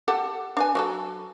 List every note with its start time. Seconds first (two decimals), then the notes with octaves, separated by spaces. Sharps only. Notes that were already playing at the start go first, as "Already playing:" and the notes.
0.08 G4 A4 F#5
0.57 D4 B4 G#5
0.75 F#3 F#4 A4